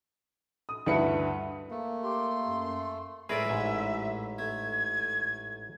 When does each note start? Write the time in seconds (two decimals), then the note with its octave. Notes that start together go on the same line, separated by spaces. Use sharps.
0.69 D#6
0.86 D2 G2 E4 B4 B5 C#7
1.71 A3 A#3
2.03 G4 C6
2.47 F#2
3.29 A2 G#3 G#4 A#4 B4 D5 E5
3.49 A1 G#2 G#5
4.39 A3 G#6